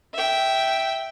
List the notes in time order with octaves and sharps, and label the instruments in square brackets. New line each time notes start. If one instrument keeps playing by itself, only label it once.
[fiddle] E5 G5